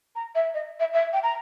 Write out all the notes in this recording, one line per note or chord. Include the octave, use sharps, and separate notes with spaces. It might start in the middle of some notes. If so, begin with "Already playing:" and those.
A#5
E5
D#5
E5
E5
G5
A#5